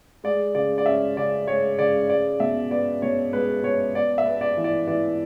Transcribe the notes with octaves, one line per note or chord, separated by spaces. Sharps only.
G#3 D5
C#3 D5
D5
C#4 E5
C#3 D5
G#3 C#5
C#3 D5
G#3 D5
B2 E5
B3 D5
B2 C#5
G#3 B4
B2 C#5
B3 D5
E5
B3
D5
E3
D5
E3 D5